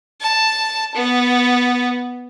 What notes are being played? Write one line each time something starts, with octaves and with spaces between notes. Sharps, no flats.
A5
B3